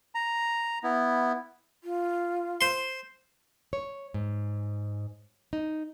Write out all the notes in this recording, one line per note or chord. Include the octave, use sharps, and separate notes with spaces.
A#5
B3 E4
F4
C5 C6
C#5
G#2
D#4